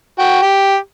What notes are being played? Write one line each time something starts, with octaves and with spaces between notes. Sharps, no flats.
F#4 G5
G4